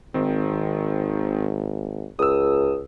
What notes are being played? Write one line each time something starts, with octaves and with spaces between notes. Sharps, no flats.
G#1 D#3 C4
C#2 D#6 E6